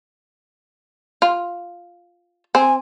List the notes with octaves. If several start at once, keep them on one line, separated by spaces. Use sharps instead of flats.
F4
C4 G#5